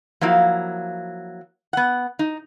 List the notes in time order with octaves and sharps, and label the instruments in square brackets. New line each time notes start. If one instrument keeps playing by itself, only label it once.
[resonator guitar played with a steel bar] F3 F#3 A#3 E4 F5
B3 F#5
D#4